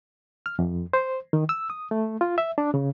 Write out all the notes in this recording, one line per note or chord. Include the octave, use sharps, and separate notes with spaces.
F6
F2
C5
D#3
E6
D#6
A3
F4
E5
D4
C#3